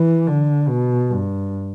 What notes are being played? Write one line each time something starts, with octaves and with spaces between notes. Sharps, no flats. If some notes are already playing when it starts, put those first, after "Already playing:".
Already playing: E3
D3
B2
G2